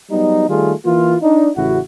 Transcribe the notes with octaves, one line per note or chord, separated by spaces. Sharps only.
F#3 G3 B3 D#4
D#3 G3 A3 F4 G#4
E3 A#3 F4
D4 D#4
A1 C#3 E4 F#4